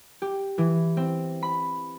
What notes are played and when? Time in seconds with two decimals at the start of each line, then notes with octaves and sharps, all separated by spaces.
0.22 G4
0.58 E3
0.97 C4
1.42 B5